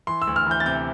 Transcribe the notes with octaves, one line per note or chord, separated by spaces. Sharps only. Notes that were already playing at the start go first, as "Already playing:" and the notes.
E3 C6
E6
D2
F6
E3 G6
A6
C3 G6